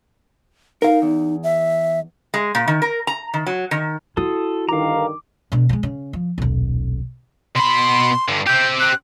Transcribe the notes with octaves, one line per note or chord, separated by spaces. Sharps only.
D#4 A#4 F5
E2
E5
G#3
A#2
D#3
A#4
A#5
D#3
F#3
D#3
E4 F#4 A4 D#6
G2 D3 D#3 F5 A#5 D6
B2 D3
F#3 G#3
C#3
F3
D#1 B1
B2 B5 C6
G2 D3
C4 G4 G6
F#6